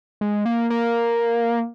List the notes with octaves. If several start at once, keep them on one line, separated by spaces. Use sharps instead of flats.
G#3
A#3
A#3